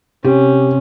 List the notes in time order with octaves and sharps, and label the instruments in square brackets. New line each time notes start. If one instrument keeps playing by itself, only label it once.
[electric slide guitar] C3 [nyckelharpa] C#4 [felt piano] G4